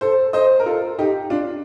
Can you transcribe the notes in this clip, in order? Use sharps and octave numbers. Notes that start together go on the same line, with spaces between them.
A4 C5
C5 D#5
A#4
F4 A4
D#4 G4
D4 F4